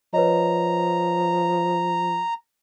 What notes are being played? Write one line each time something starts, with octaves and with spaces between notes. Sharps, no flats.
F3 B4 C#5 D#5 A#5